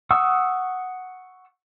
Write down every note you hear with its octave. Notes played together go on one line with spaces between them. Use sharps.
F#5 C#6 D#6 E6